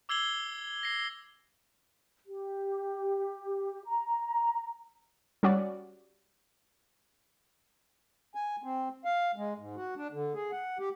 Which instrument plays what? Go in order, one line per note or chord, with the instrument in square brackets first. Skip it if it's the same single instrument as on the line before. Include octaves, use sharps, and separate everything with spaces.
[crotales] D6 E6 G#6 C7 F#7 G7
A#6 C7
[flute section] G4
A#5
[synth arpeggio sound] G3 C#4 F#4 D5
[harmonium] G#5
C4
F5
G#3
G#2
F#4
D4
D3
G#4
F#5
G4